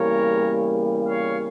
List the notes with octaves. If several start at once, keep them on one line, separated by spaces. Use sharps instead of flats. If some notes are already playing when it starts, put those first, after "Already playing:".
Already playing: E2 C#3 G3 A#3 A#4 C#5
C#5 F5